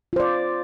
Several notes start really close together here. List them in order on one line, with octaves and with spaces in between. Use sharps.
F4 C5 D5